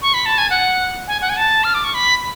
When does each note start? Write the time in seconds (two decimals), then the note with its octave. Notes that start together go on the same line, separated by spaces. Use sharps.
0.02 C#6
0.14 B5
0.26 A5
0.38 G#5
0.50 F#5
1.08 G#5
1.22 F#5
1.29 G#5
1.37 A5
1.64 F6
1.74 D6
1.84 C#6
1.94 B5